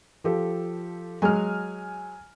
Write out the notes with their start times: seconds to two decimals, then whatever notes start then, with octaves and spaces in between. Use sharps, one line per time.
0.24 F3 G4 A4
1.22 F#3 G#3 G#5 F6